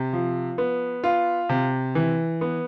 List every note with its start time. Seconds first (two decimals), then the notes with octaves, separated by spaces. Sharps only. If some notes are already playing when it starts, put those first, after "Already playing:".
Already playing: C3
0.13 F3
0.58 B3
1.04 F4
1.49 C3
1.95 E3
2.41 B3